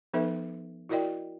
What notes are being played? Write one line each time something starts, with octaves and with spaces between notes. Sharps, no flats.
F3 B3 D#4 A4 B4 E5
E4 F#4 A#4 D5 D#5 G5